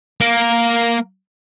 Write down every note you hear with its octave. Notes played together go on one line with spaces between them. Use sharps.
A#3 A#4